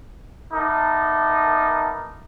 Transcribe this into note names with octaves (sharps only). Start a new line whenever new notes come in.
B3 D#4 A#4 E5 A5 D6